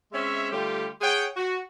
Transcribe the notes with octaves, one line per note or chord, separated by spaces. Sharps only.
G#3 C4 C#4 C#5 E5
D3 G3 A3 F4 G4
G#4 C#5 F#5 G5
F#4